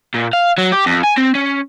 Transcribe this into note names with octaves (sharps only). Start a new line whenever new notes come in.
A#2
F5
F#3
G4
F2
G#5
C4
C#4